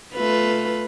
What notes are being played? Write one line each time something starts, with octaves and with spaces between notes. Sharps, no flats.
A3 F4 B4